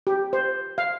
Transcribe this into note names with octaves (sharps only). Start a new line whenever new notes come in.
G4
C5
F5